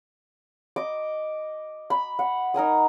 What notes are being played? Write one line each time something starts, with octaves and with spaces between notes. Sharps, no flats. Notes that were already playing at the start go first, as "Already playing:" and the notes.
D#5 D6
B5
F#5
D#4 A#4 G#5 D#6